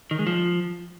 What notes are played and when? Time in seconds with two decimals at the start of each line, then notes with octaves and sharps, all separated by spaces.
0.11 D#3
0.19 G#3
0.27 F3